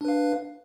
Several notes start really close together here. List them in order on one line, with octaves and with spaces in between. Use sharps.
D4 B4 F5